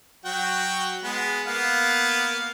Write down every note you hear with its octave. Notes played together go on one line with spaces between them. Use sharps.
F#3 F#4 G5
G#3 B3
A#3 B3 F5